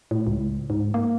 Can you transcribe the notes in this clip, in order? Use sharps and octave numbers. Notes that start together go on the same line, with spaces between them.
A2
C#2
G#2
A#3